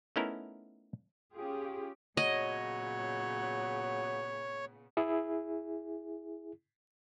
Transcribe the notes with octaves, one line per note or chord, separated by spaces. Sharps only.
A3 B3 C#4 D#4 E4 A#4
C#4 F4 G4 G#4
A#2 C#3 F#3 B3 C#5 D#5
E4 G#4